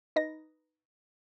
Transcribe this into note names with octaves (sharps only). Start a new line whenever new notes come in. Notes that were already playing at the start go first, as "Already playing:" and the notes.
D#4 B4 D#5 A#6